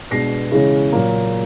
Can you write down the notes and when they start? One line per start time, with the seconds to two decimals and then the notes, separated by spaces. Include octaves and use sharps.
0.11 B2 G#3 B3 D4 A#6 C7
0.52 C#3 E3 G#3 C#4
0.92 A#2 F#3 A#3